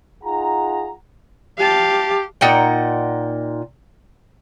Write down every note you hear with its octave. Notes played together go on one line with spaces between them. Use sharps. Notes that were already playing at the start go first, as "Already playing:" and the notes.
D#4 F4 G#4 F#5 A#5
G4 F5 A5
A#2 D#4 F#5 G5